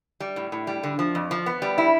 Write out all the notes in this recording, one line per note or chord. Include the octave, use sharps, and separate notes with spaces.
G3
A2
A2
G3
D3
F3
F2
F3
B3
G3
E4